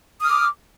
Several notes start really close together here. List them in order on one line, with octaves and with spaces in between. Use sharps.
D#6 F6 D6